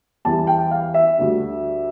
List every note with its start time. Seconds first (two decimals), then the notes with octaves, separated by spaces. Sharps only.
0.25 E2 E3 G3 A5
0.47 G5
0.71 F5
0.94 E5
1.18 D2 D3 G3